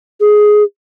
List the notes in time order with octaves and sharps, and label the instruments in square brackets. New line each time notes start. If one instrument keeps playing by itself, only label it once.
[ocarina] G#4